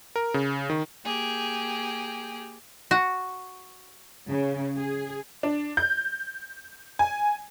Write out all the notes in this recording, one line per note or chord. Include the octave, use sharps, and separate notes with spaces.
A#4
C#3
D#3
A#3 G4 G#4 G5
F#4
C#3
G#4
D4
G6
G#5